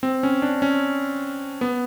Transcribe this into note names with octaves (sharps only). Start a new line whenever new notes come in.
C4
C#4
D4
C#4
B3